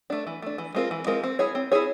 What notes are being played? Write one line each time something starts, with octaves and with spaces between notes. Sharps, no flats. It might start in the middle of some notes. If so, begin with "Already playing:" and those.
A3 D4
E3
A3 D4
E3
G#3 C4 F4 A#4
E3
G#3 C4 F4 A#4
C4
E4 G#4 C#5
C4
E4 G#4 C#5